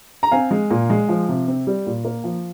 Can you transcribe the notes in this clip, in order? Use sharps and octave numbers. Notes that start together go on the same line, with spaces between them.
A#5
C4 F5 G#5
G#3
A#2
G#3
F3
C3
C4
G3
A#2
A#3
F3